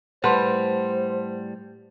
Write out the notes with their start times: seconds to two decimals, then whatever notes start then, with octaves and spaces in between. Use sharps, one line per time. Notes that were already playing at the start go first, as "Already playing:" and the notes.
0.24 A2 G3 B4 C5 F#5 A5 C6